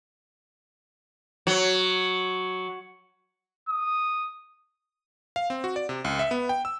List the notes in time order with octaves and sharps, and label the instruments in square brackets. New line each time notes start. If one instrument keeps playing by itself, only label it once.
[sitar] F#3
[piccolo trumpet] D#6
[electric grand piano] F5
C4
F#4
D5
C3
C#2
E5
B3
G5
E6